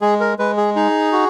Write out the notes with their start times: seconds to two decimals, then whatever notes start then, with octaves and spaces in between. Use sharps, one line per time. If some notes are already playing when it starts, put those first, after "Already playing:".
0.01 G#3 G#4
0.20 A#4
0.39 G#3 B4
0.57 G#4
0.76 D#4 G#4
1.12 F#4